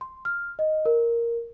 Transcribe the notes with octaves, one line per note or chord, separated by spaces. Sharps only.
C6
F6
D#5
A#4